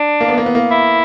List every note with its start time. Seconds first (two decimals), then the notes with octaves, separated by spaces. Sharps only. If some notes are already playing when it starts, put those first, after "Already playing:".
Already playing: D4
0.21 A#3
0.28 B3
0.38 A#3
0.46 B3
0.55 A#3
0.71 E4